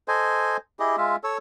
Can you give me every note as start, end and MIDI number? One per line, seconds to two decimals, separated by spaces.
0.08 0.57 69
0.08 0.57 72
0.08 0.57 75
0.08 0.57 80
0.80 0.96 64
0.80 0.96 67
0.80 0.96 68
0.80 0.96 75
0.98 1.16 56
0.98 1.16 65
0.98 1.16 76
1.24 1.38 69
1.24 1.38 73
1.24 1.38 88